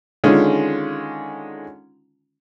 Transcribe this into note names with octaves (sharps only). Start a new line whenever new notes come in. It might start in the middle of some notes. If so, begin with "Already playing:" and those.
D3 D#3 G#3 C#4 F4